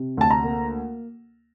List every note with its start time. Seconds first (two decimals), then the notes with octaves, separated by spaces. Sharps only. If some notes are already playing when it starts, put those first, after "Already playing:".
Already playing: C3
0.17 D2 A5
0.30 A#5
0.43 A#3